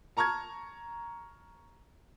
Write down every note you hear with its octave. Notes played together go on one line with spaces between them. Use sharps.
A5 A#5 C#6 F6 G#6